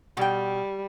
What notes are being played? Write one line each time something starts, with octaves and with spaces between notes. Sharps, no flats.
B2 G3 G5